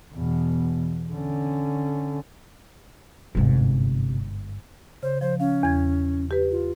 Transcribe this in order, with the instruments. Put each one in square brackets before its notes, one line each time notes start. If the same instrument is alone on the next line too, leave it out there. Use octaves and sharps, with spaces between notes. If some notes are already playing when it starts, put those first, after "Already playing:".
[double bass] E2 B2
D3 C#4
[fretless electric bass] G1 G#2 [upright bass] E2 C3
[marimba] C#3 [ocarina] C5
[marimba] F3 [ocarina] C5
[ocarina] C#4 [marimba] F5
[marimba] E2 G#6
G4 B4
[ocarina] F4